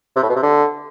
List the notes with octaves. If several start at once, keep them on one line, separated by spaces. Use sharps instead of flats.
C3
A2
B2
C3
D3